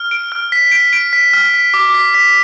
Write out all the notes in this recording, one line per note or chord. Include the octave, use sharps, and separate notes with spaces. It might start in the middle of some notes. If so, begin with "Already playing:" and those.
Already playing: F6
D7
F6
B6
D7
D7
B6
F6
B6
D6
B6
B6